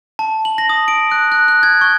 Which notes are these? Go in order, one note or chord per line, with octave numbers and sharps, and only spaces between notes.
A5
F#7
A#6
D#6
D7
F#6
F#6
F#6
G#6
C#6